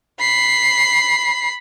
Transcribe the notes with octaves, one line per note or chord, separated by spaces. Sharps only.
B5 C7